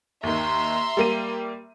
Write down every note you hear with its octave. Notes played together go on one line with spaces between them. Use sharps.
D#2 D#3 E5 A#5 C6
G3 A#3 D#7